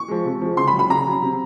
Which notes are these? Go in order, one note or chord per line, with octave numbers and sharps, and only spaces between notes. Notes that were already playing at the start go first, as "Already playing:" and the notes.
Already playing: C#6
F3 G#3
C3
F3 G#3
C#3 C6
B5
F#3
B5
C#3 A#5
F#3
C3